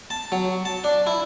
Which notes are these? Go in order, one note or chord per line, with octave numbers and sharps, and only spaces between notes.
A5
F#3
A5
D4
E4